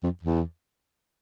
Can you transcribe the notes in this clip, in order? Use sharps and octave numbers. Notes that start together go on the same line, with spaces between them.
F2
E2